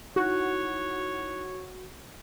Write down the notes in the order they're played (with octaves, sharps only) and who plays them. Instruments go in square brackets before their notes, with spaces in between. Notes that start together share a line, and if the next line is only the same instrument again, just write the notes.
[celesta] D#4 E4 F#6 [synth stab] F#4 [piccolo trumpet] C#5